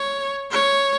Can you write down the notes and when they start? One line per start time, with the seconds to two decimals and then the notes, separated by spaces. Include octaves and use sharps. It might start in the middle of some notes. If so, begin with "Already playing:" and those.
Already playing: C#5
0.51 C#5